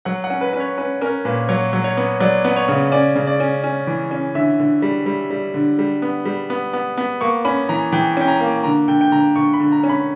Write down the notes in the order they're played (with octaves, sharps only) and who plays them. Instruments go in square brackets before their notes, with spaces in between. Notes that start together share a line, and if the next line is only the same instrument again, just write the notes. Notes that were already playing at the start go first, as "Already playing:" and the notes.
[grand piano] F#3 F#5
F#5
C#4
B4
C#4 B4
C#5
C#4 B4
C#4 A#4
A#2 B4
F#3 C#5
F#3
C#5
B3
F#3 D5
B3
C#5
C#3
C#4 D5
C#3
D5
C#4
C#4
E3
C#4
D3 E5
D3
G3
G3
G3
D3
G3
B3
G3
B3
B3
B3
A#3 C#6
C#4 B5
E3 A#5
E3 G5
C#4 G5
A#5
A#3
D3 A#5
D3 G5
G5
D3 A#5
D3 C#6
B5
D3
A#5
C#4
B5